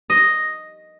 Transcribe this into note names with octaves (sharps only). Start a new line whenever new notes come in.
D#5